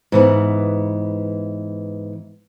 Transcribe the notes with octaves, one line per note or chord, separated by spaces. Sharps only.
G#2 E3 B3